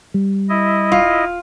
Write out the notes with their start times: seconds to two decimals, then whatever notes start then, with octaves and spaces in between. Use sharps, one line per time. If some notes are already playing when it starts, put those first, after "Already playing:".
0.14 G3
0.49 E4 D#5
0.92 D#1 F4